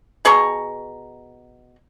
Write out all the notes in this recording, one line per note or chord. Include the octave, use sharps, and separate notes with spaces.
B2 G#4 A#5 C#6